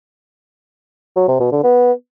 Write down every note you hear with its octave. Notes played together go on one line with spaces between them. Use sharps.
F#3
C3
B2
D3
B3